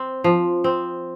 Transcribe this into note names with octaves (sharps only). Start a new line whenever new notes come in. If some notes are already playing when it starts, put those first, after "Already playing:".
Already playing: C4
F3
C4